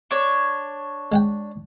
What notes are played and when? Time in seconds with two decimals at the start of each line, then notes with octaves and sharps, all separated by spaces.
0.11 D4 C#5
1.12 G#3 F#5 G5